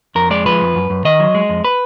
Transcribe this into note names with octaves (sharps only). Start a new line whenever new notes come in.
F2 A#4
G#3 D5
F3 B4
F2
F#2
F#2
D#3 D#5
F#3
G#3
F2
B4